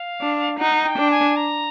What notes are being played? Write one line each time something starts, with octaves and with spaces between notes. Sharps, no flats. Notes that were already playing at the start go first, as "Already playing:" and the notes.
Already playing: F5
D4
D#4 F#5
G5
D4
G#5
A#5